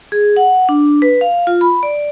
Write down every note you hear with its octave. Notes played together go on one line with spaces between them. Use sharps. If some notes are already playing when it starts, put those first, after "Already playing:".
G#4
F#5
D4
B4
F5
F4
B5
D5